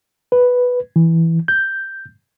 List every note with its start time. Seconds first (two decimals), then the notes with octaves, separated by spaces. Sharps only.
0.32 B4
0.96 E3
1.48 G6